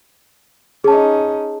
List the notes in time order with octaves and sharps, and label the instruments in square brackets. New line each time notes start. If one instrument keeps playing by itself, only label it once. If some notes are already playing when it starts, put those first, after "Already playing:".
[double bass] C#4 D#4 [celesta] G#4 A5